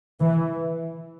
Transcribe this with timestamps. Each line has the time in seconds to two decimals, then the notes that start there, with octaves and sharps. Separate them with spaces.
0.21 E3